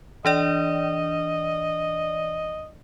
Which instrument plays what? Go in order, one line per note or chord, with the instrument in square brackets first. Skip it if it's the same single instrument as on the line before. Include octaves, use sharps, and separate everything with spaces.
[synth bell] E3 D4 D5 [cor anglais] D#5